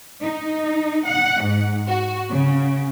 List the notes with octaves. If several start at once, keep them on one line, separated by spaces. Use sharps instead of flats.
D#4
F#5
G#2
F#4
C#3